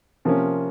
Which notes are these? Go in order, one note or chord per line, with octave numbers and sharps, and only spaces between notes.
C3 F3 A#3 C#4